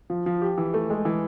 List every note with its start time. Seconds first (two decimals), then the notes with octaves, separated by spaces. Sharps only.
0.10 F3
0.26 F3
0.42 G4
0.58 E3
0.74 A3
0.90 G#3
1.05 E3